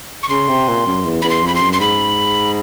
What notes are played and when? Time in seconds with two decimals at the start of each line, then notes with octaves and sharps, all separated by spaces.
0.23 C#6
0.29 C#3 C6
0.48 C3
0.68 A#2
0.87 F#2
1.05 E2
1.22 E2 B5
1.29 C6
1.43 F2 B5
1.55 C6
1.61 F#2
1.73 C6
1.80 G#2 B5